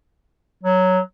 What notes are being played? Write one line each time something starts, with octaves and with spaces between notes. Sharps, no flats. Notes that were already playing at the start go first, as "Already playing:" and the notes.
F#3